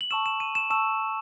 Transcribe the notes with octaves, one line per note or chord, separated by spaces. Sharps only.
F#7
A5 C#6 E6 E7
E7
D#7
E7
A5 C#6 E6 E7